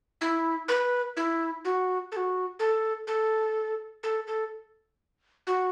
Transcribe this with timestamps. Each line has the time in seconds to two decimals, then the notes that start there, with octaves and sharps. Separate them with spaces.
0.21 E4
0.68 B4
1.17 E4
1.65 F#4
2.12 A4
2.17 F#4
2.59 A4
3.07 A4
4.03 A4
4.27 A4
5.47 F#4